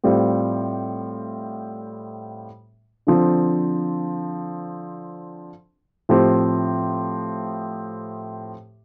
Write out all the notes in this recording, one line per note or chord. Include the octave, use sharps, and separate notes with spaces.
A2 G3 C4 F4
D3 F3 C4
A2 F3 C4 G4